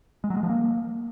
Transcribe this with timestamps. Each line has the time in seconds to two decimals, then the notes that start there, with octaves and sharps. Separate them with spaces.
0.24 G#3
0.30 F#3
0.37 G#3
0.43 F3
0.49 A#3